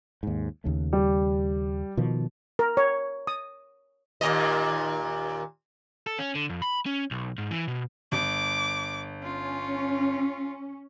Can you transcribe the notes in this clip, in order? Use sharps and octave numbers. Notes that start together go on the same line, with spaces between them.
D#2 G#2
D#2 C#3 A3
G3
B2 D#3 F3
A#4
C#5
D#6
D#2 A#2 D#5
A4
C#4
D3
F2
B5
C#4
B1
G#2
E3
B2
G1 D6
C#4 F4